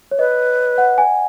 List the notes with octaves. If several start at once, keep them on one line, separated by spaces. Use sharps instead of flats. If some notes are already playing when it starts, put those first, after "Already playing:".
C#5
B4 D#5
F#5
G#5